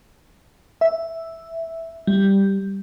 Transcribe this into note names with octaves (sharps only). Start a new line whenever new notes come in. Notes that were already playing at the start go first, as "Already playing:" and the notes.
E5
G3